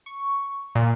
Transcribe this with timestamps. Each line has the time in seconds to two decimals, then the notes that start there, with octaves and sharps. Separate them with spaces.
0.06 C#6
0.75 A#2